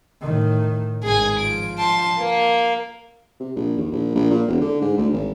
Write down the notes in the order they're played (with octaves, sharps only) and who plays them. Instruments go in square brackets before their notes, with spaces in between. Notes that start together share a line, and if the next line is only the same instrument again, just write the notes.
[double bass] A2 D#3
[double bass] G#1 [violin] G#4 G#5
[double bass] F3 [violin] D7
[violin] A5 C6
A#3
[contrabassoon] C3
A#1
D#2
A#1
A#1
A#2
E1
D3
G#2
D2
G#1